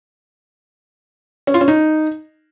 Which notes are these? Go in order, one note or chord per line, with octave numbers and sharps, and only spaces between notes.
C#4
F4
C#4
D#4